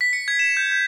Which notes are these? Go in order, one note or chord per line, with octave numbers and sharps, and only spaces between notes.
B6
C#7
G#6
E7
G6
G6